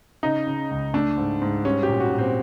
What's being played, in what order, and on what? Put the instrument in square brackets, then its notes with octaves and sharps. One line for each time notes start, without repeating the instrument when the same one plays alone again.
[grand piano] C#3 D#4
C#3
C#2
A3 D4
G#2
G#2
G3 C#4
G4
A#2
F#4
A#2
C4